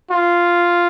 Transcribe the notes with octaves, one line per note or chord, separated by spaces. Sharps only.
F4